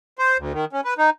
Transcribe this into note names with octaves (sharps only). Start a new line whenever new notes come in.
C5
D2
D#3
C#4
B4
D#4